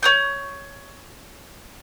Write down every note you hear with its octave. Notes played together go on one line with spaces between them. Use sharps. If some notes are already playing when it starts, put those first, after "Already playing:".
C#5 D#6 G6